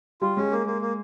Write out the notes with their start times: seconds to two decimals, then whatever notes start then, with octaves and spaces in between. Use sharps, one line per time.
0.22 G3 F4
0.36 G#3 C#4
0.52 A#3
0.66 A#3
0.82 A#3